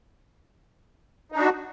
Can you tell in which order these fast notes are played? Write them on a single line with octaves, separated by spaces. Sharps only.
D#4 D4 F#4